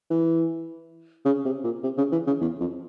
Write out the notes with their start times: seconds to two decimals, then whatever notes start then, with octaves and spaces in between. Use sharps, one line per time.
0.10 E3
1.25 C#3
1.45 C3
1.64 A#2
1.83 C3
1.98 C#3
2.12 E3
2.27 C#3
2.41 E2
2.61 F2